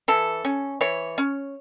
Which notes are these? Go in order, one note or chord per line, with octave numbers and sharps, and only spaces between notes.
E3 A4
C#4
E3 C#5
C#4